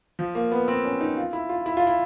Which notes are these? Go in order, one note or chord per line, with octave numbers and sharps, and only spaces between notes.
F3
A#3
B3
C4
C#4
D#4
F4
E4
F4
E4
F4
E4